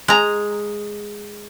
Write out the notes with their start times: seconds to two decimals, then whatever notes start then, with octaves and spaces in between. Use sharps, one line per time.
0.08 G#3 A#5